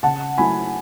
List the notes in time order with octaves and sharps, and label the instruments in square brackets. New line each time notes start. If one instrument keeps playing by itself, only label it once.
[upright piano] C#3 F#5 A5
F#3 A3 E4 G#5 B5